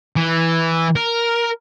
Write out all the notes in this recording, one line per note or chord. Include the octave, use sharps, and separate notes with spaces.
E3
A#4